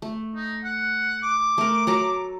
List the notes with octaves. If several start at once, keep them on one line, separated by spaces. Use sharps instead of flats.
A3
D#4
F#5
D6
A3 A#4
F#3 A4 A#5